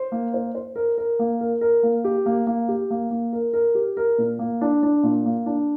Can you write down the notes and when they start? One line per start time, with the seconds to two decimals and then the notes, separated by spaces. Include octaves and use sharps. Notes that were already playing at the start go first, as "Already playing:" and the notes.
Already playing: C5
0.12 A#3
0.34 C5
0.55 C5
0.76 A#4
0.98 A#4
1.19 A#3
1.41 A#4
1.61 A#4
1.83 A#3
2.04 G4
2.26 A#3
2.47 A#3
2.68 G4
2.90 A#3
3.11 A#3
3.33 A#4
3.53 A#4
3.75 G4
3.97 A#4
4.18 A#2
4.39 A#3
4.61 D4
4.83 D4
5.03 A#2
5.25 A#3
5.46 D4